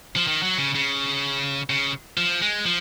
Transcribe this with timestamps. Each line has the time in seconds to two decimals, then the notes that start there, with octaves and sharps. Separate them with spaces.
0.16 F3
0.27 D#3
0.43 F#3
0.58 C#3
0.75 C#3
1.70 C#3
2.17 F3
2.42 G#3
2.65 F3